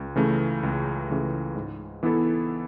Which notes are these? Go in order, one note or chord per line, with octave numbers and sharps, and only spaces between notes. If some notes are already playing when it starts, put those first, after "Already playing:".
Already playing: C#2
C#3 E3 A3
C#2
C#3 E3 A3
G#2
E3 B3 E4 A4